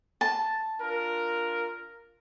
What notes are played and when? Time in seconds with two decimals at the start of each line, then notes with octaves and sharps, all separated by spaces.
0.21 A5
0.80 D4 F4 A#4